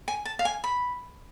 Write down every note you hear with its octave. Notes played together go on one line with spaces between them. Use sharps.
G#5
A5
F5
G#5
B5